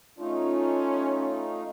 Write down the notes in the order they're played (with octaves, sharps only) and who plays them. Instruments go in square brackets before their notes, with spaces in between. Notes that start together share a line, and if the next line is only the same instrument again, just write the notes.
[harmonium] A3 D#4 F4 [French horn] C#4